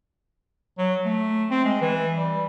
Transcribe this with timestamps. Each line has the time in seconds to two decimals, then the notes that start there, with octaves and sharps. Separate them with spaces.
0.78 F#3
1.05 A3
1.50 C4
1.64 G#3
1.81 E3
2.17 G3